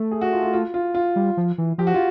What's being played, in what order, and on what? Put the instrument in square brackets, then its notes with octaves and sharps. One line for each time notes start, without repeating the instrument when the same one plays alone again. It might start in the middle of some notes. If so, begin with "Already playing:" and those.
Already playing: [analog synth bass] A3
[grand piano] G#4
F#4
F4
F4
F4
F4
F4
[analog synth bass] G3
F3
E3
[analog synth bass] F3 [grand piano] G4
[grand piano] F#4
F4